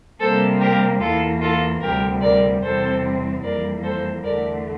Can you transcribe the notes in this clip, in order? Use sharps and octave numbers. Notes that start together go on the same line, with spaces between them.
C3 G3 A#3 A4 C5
G4 A#4
E2 E3 A#3 F4 A4
F4 A4
D2 C3 G3 G4 A#4
A#4 D5
E2 C3 G3 C4 A4 C5
F2 E3 G3 A#3 A#4 D5
A4 C5
E2 D3 A3 A#4 D5